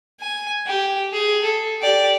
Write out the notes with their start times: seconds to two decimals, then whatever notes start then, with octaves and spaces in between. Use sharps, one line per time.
0.20 G#5
0.66 G4
1.12 G#4
1.43 A4
1.81 G4 D5